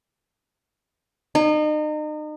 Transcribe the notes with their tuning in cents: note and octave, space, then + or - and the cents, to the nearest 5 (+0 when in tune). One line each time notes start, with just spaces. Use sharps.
D#4 -35